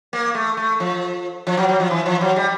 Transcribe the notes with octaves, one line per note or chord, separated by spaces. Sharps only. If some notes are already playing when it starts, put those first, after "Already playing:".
A#3
A3
A3
F3
F3
F#3
F#3
F3
E3
F3
F#3
G3